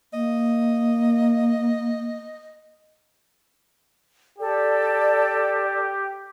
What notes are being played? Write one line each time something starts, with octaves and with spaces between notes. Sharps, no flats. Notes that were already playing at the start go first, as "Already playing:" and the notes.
A#3 D#5
G4 A4 D5